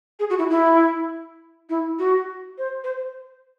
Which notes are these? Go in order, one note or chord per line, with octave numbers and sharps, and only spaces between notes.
G#4
F#4
E4
E4
E4
F#4
C5
C5